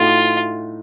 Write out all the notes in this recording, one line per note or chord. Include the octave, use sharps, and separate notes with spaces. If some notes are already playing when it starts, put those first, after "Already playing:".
Already playing: A2 A3 D#4 F4 F#4